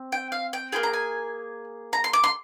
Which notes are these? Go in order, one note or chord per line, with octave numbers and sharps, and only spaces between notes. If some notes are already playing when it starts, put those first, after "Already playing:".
Already playing: C4
G5
F5
G5
A#3 F4 G#4 G5
A#5
G#5
A#5
C6
D6
C6